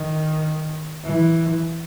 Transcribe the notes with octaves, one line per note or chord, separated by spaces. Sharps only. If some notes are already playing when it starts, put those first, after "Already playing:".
Already playing: D#3
E3